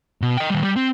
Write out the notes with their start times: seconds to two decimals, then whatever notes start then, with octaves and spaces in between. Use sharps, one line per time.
0.22 B2
0.37 D#5 G5
0.50 D#3 G3
0.63 G3
0.76 C4